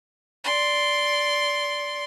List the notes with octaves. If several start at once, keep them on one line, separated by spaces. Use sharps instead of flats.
D5 C6